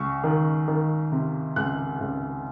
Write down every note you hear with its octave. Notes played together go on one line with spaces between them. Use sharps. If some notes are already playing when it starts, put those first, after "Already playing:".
Already playing: C#2 C#6
D#3
D#3
C3
C#2 F#6
C#2